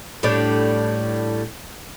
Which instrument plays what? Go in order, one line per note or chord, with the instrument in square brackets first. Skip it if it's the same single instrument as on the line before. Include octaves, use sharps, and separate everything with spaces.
[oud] A2 G3 D4